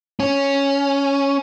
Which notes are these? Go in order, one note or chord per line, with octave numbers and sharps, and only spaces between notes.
C#4